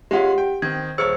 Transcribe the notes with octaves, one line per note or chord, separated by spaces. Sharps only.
G#3 C#4 F4 G4 F#5
G5
D#3 C4 G#6
D#1 G#4 C5 C#5 E6 C#7